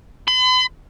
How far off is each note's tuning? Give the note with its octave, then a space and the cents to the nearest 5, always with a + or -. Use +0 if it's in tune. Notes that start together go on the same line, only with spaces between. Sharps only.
B5 +45